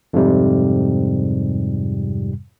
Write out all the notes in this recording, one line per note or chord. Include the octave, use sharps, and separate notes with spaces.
F2 G#2 C3 G3